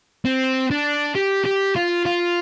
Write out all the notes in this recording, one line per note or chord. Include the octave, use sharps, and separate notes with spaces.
C4
D4
G4
G4
F4
F4